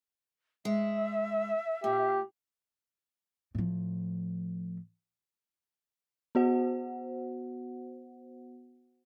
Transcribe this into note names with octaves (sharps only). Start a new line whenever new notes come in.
G#3 E5
A#2 G4
A2 F3
B3 F#4 C5 F#5